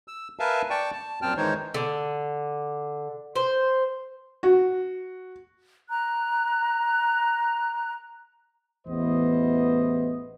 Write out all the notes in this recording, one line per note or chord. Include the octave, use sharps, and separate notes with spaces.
E6
A#4 B4 E5 F5 G#5 A5
D5 G5 A5 C#6
A5
F#2 A#2 C4 G5 A5 F6
D#3 E3 G#3 D#4 C5 C#5
D3
C5
F#4
A#5 F#6
A1 E2 E3 B3 C5 D#5